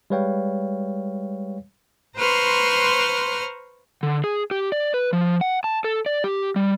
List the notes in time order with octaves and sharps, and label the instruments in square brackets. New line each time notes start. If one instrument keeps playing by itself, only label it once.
[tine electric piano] G3 G#3 B4 C#5 F5 G5
[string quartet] B4 C5 A#5 C6 C#6 F6
[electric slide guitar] D3
G#4
G4
D5
B4
F3
F#5
A5
A4
D5
G4
G3